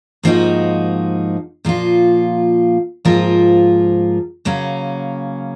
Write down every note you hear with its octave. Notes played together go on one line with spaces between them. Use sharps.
G#2 F3 A#3 D#4 F#4
A#2 F3 A#3 F4
G#2 F3 A#3 F4 A#4
C#3 F#3 A#3 C#4